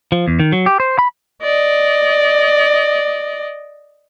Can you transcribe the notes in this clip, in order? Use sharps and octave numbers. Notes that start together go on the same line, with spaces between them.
F3
E2
D#3
F#3
G4
C5
B5
D5 D#5